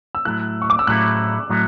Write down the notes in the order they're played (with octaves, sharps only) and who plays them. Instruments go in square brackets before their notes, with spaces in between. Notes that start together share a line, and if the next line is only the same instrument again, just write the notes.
[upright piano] E6
[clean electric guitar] A2 F#3 A3 E4 [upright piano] F#6
[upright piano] C#6
D6
E6
[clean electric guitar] A2 F#3 A3 E4 [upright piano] F#6
[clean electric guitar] A2 F#3 A3